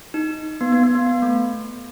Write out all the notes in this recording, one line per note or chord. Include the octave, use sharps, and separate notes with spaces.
D#4
B3
B3
B3
B3
B3
A3